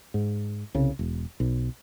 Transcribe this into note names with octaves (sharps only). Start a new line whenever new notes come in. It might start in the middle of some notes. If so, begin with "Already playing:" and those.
G#2
C2 C#3
E1
B1